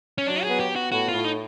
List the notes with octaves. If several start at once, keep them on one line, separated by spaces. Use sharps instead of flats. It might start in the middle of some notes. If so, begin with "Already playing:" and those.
C#4
F#3 D4
G#4
B3
G4
B3
F#4
A2 F#4
A2 F4
D#4